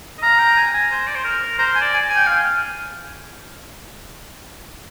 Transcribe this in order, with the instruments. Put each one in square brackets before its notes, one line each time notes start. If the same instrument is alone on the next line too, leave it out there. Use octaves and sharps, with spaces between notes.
[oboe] D#5
[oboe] F5 [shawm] A#5
[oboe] G5
G#5
G#5
C5
D5
C5
A#4
[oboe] C5 [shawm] A#5
[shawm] G#5
[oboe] D5
[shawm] G#5
G#5
[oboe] G5
F5